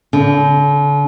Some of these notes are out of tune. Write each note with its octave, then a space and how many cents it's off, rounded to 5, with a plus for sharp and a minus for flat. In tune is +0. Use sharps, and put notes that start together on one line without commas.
D3 -40